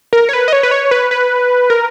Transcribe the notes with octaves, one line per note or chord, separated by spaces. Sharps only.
A#4
C#5
B4
D#5
C#5
B4
C#5
B4
B4
A#4